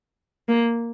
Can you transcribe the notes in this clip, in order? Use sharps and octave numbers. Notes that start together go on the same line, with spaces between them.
A#3